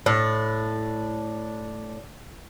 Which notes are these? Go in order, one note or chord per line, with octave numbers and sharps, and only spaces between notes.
A2 D4